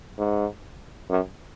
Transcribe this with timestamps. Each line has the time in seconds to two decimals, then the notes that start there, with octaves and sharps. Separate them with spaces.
0.18 G#2
1.10 F#2